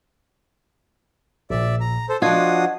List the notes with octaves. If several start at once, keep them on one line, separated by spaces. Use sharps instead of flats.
A#1 A#2 D5 E5
A#5
A4 C5
F3 D4 F4 F#4 D#5 F#5 D#6 G#6